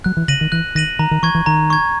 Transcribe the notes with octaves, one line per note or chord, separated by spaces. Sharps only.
F#3 F#6
E3
C#3 A#6 D#7 F#7
D#3
E3 F#6
D#3 A#6 D#7 F#7
D#3 A#5
D#3
E3 C#6 G#6
E3
D#3 A#5
C#6 G#6